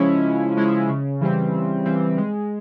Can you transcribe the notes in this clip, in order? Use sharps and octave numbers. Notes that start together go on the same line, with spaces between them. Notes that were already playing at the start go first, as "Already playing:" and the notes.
Already playing: C#3 F3 G#3 C#4 E4
C#3
F3 G#3 C#4 E4
C#3
E3 G3 C4
C#3
E3 G3 C4
G#3